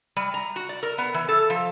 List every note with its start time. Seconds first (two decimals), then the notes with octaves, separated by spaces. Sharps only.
0.17 G3
0.34 A#5
0.56 F#4
0.69 D5
0.83 A#4
0.98 B3
1.14 E3
1.29 A4
1.50 F3